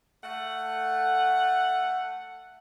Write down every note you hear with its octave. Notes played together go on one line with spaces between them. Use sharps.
A3 F#5